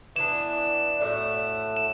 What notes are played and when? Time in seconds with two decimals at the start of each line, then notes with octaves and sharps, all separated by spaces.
0.16 E3 B3 D4 E7
1.01 A2 A3 D4 F#4
1.77 E7